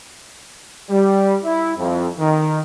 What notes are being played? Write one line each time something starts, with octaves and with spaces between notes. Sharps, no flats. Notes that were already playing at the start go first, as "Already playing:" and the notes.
G3
E4
F2
D#3